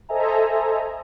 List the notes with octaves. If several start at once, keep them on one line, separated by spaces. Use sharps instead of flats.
A4 C5 D#5 E5 G#5 A#5